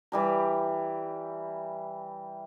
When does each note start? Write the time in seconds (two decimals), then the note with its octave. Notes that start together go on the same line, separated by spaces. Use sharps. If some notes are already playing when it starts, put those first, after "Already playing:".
0.12 E3 G3 A#5